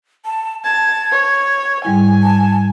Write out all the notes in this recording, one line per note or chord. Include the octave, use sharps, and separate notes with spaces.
A5
A5 G#6
C#5
G#2 G3 E4 G#5
A5